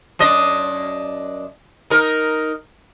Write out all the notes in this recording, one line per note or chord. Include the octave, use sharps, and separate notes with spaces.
F#2 D4 D#5
D#4 A#4